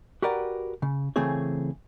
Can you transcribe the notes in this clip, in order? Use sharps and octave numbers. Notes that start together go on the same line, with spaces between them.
F#4 G4 A#4 B4 D5 F#5
C#3
C#3 E3 A3 C4 G#4 C#5